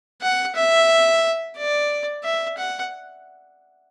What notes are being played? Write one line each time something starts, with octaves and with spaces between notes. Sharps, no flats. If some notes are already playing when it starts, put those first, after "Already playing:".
F#5
E5
D5
E5
F#5